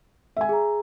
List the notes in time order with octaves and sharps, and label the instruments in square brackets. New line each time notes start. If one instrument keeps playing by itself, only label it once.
[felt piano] E5 G#5
[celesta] G#4 A#5